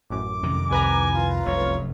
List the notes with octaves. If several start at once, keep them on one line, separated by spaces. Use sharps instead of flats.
A1 F#2 D6
F2 C3 D#3
C2 B4 G#5 A#5
F4
F1 F#2 C#5